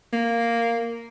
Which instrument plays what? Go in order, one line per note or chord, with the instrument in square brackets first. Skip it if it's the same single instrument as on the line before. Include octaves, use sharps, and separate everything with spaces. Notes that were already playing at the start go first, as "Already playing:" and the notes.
[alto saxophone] A#3